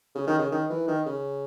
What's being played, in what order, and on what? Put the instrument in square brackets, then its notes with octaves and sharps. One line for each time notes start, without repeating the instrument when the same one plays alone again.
[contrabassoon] C#3
D#3
C#3
D#3
E3
D#3
C#3